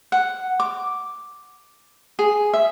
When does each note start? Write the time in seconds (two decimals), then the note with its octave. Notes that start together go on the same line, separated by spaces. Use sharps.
0.12 F#5
0.60 D6
2.19 G#4
2.53 E5